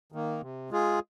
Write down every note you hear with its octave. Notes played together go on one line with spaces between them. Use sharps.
D#3 A#3
C3
G#3 F4 G#4